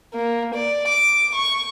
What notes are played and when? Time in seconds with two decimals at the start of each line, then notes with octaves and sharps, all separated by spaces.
0.14 A#3
0.55 D5
0.88 D6
1.35 C#6